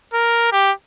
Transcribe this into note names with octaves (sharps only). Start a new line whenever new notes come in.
A#4
G4